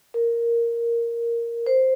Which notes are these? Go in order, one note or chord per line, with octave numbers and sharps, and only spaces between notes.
A#4
C5